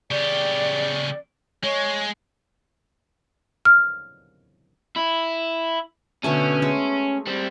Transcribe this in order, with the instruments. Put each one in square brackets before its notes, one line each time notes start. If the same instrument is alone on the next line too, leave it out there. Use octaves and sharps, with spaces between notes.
[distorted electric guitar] C#3 G4 [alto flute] D5
[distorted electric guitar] G#3 [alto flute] C#5
[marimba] F6
[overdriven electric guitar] E4
[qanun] B2 D3 A3 [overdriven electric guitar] C#4
[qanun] G#3 A3
[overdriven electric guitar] G3 C4